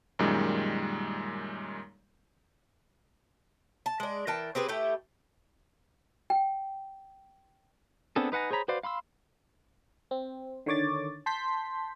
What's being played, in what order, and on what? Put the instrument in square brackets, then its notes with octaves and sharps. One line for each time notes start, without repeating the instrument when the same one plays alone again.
[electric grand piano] F#2 A#2 D#3 G3 G#3
[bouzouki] A5
G#3 D4
E3 A#4 G5 A5
C4 G4 G#4 B4
A3 E4 G4 A4
[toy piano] G5
[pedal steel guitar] B3 C4 D4 G#4 A4
D#4 B4 F#5 G#5 A#5
G#4 C5 C#5 A#5 B5
F#4 B4 C5 D5 F5
F5 B5 C6 E6
[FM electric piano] C4
D3 D#3 C#5 D6 A6
A5 C6 G6 B6